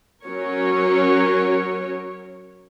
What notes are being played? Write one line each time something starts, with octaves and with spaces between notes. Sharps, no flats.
F#3 C#4 A#4 C#5